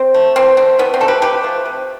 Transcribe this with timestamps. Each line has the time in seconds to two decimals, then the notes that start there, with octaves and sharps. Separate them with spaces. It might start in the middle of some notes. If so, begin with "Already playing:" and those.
Already playing: C4
0.14 A3
0.36 E3 C4
0.57 A3 C4
0.79 E3 B3
0.94 C4
1.00 A3 A4
1.08 G4 B4
1.22 C3 G4 B4
1.43 F3 A3
1.65 C3